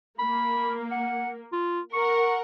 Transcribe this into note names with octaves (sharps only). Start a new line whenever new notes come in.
A#3 B5
F#5
F4
A#4 F#5 C#6